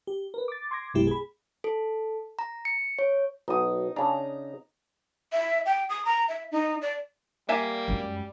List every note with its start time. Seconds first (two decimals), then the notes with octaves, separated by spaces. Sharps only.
0.07 G4
0.34 A#4 B4
0.48 D6 A6
0.71 C6 D6 G#6 A#6
0.94 B1 F#2 B2 G#3 E4 G4
1.07 G#4 B5
1.64 A4
2.39 A#5
2.65 C#7
2.99 C#5
3.48 B1 D#4 D#6
3.96 C#3 D4 A#5
5.32 E5
5.66 G5
5.89 D#6
6.05 A#5
6.29 E5
6.52 D#4
6.82 D5
7.49 G3 A#3 D5 E5 G#5
7.88 F#2 G#3